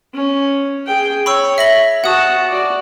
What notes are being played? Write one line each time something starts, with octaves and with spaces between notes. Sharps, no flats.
C#4
G#4 G5
C#5 B5 C#6 E6
E5 A#6 F#7
F#4 F#5 A5 D#6
F#4 D5